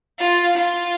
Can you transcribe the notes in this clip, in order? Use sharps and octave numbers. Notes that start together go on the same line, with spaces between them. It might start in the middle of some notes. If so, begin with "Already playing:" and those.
F4
F4